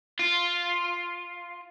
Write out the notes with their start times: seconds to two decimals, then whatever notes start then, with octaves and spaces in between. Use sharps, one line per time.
0.19 F4